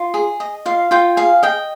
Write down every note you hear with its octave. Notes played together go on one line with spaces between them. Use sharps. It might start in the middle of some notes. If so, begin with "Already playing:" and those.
Already playing: F4
G#4
D#5
F4 F5
F4 G5
G#4 F5
D#5 G5